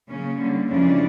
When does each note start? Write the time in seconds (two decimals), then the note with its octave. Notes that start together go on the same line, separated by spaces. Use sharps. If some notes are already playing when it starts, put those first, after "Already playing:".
0.09 C#3 F#3 A#3 C#4
0.38 D3 G3 A#3
0.68 F2 C#3 E3 G#3 C#4 D4